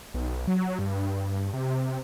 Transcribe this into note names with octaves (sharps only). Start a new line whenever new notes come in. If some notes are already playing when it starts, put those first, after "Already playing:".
B1
F#3
G2
C3